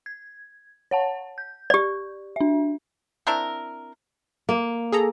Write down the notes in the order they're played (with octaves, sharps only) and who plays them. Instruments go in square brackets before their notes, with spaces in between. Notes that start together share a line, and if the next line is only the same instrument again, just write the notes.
[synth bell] G#6
C#5 F#5 A5
G6
[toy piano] G4 D5
[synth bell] D4 E5
[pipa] C4 D4 E4 A#4
[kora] A#3
[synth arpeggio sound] G#4 A4 A#5